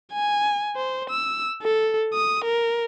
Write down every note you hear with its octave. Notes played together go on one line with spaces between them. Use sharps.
G#5
C5
E6
A4
D#6
A#4